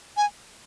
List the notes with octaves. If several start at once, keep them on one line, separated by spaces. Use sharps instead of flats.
G#5